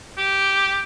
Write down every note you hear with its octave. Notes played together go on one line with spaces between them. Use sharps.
G4